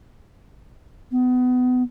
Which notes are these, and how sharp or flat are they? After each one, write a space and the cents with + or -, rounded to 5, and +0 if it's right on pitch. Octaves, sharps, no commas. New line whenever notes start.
B3 +25